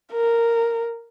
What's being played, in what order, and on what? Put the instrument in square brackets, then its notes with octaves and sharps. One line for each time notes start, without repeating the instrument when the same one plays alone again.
[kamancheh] A#4